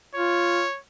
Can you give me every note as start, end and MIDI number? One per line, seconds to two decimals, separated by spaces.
0.15 0.65 65
0.15 0.79 73